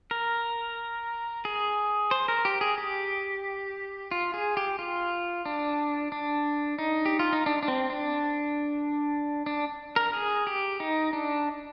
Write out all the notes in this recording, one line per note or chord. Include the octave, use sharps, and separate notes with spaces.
A#4
G#4
C5
A#4
G4
G#4
G4
F4
G#4
G4
F4
D4
D4
D#4
G4
F4
D#4
D4
D4
C4
D4
D4
A#4
G#4
G4
D#4
D4